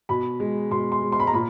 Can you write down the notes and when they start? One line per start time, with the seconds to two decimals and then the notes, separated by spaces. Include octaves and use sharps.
0.09 B2 B5
0.40 G#3
0.71 B2 C6
0.92 C6
1.02 G#3
1.12 C6
1.20 B5
1.27 A#5
1.33 A#2 B5